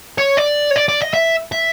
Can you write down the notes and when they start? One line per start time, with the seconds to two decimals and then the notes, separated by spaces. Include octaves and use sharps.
0.18 C#5
0.37 D5
0.71 C#5
0.76 D5
0.88 D5
1.01 D#5
1.14 E5
1.52 E5